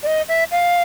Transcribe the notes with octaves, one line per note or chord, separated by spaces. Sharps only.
D5
D#5
E5
F5